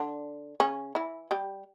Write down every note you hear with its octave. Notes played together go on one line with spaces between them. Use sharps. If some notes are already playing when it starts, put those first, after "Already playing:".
Already playing: D3 D4
C#3 C#4
E3 E4
G3 G4